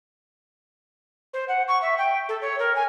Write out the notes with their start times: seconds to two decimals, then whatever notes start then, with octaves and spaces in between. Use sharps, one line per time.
1.33 C5
1.48 F#5
1.68 C#6
1.81 E5
1.97 G5
2.28 A4
2.41 C#5
2.59 A#4
2.75 G#5